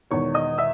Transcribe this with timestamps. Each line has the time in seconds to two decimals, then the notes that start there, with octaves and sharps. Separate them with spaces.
0.11 E1 E2 D#3 C#5 C#6
0.34 D#5 D#6
0.58 E5 E6